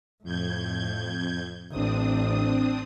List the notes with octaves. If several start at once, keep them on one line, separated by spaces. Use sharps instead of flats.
F2 A2 G6 G#6
A1 C4 D4 D#6